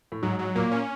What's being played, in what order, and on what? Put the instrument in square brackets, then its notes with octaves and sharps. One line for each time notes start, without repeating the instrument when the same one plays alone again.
[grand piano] A2
[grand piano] G#2 [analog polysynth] F#3
[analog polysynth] F#3
[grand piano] A#2 [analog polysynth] A#3
[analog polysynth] C#4